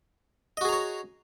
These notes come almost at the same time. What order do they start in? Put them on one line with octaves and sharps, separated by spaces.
D#5 F#4 G#4 A#5 C#5